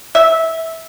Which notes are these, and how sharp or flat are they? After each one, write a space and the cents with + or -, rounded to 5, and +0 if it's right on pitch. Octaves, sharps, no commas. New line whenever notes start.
E5 -15